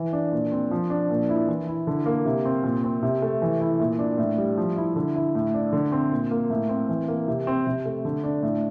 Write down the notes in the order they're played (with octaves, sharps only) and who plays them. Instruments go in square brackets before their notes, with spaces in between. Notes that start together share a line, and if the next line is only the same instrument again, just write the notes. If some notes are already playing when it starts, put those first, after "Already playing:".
Already playing: [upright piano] E3
D4
A#2
C4
F3
D4
A#2
E4
E3
E4
D3
A#3
C3
C4
A#2
C4
C3
A3
E3
E4
A#2
D4
A2
G3
F3
E4
D3
E4
A2
D4
D3
C4
A#2
A#3
A2
C4
E3
A#3
C3
C4
C3
A3
D3
D4
A2